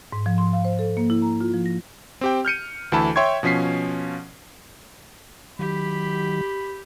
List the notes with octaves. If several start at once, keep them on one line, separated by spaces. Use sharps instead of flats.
G#2
F3
C6
F5
C5
A4
A#3
E4
A#5
F4
F3
A#6
C4 G4 G5
F6 G6 C#7 D#7
D2 E3 A4 A5 B5
C#5 E5 G5 C6 C#6 G#6
B2 F3 C#4 B6 C7
D#3 F#3 G4 B5